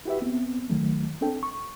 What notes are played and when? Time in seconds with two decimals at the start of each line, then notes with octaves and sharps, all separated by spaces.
0.05 E4 F#4 G4 B4 E5
0.22 B3 C4
0.70 C#2 D#3 F#3 A3
1.21 C4 D4 A4 G5
1.43 C#6